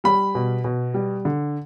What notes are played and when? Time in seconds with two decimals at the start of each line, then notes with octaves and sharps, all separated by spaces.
0.04 G3 B5
0.35 B2
0.64 B2
0.94 G3
1.25 D3